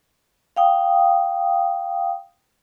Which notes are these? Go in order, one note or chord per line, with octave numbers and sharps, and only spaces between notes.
F5 G5 D#6